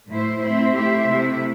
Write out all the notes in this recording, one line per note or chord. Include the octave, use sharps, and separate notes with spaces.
A2 A3 E4 C5
A3 C4 E4 C5 E5
A3 E4 G4 C5 E5
C3 A3 E4